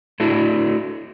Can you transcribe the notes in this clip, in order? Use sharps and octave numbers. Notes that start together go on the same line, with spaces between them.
A3 D4 E4 F#4